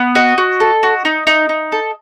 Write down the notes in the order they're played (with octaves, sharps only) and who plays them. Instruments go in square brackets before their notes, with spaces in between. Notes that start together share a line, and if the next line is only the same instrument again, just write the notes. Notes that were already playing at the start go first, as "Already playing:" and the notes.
Already playing: [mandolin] B3
F#4 D#5
F#4
A4
F#4
D#4
D#4
D#4
A4